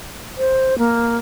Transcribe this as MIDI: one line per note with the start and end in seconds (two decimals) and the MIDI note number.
0.38 0.77 72
0.78 1.18 58